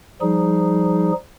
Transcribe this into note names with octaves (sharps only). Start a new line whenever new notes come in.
F3 G3 D#4 G#4